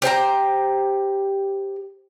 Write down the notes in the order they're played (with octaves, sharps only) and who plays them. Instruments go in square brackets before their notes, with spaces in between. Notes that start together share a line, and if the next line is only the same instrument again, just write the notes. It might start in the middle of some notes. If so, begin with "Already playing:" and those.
[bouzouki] G4 C5 G5 A#5